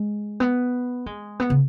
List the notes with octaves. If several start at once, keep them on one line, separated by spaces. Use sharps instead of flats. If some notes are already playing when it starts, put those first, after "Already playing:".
Already playing: G#3
B3
G#3
B3
C#3